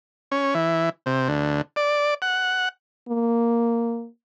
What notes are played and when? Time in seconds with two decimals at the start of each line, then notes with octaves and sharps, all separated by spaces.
0.32 C#4
0.54 E3
1.06 C3
1.28 D2
1.76 D5
2.22 F#5
3.08 A#3